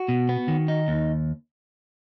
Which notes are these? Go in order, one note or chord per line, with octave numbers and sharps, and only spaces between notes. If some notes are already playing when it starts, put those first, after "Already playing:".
Already playing: F#4
B2
B3
D#3
D#4
D#2